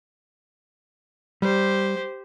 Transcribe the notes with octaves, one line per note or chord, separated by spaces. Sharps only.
G3 G4 C5